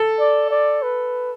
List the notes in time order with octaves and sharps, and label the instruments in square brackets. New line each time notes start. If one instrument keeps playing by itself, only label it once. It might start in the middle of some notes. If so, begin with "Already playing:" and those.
Already playing: [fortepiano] A4
[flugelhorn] D5
D5
B4